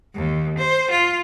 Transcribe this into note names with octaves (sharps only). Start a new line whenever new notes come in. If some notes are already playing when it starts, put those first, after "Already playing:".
D#2
C5
F4